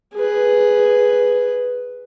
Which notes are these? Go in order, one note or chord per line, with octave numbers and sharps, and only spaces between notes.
G#4 B4